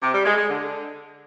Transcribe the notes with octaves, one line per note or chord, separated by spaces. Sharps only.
C3
G3
G#3
G#3
D3